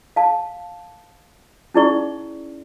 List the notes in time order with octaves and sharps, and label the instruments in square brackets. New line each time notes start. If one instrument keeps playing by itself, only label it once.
[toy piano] F5 A5
C#4 D#4 E4 G#4 D5 C#6